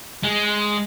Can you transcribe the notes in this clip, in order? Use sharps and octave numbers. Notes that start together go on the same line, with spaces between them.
G#3